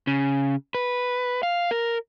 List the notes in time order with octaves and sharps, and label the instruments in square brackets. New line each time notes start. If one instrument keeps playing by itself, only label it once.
[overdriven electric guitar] C#3
B4
F5
A#4